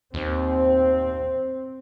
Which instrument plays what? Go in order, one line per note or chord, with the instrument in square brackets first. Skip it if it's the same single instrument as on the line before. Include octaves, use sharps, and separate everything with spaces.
[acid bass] D#2 [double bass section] C4